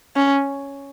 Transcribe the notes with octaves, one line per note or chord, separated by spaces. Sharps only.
C#4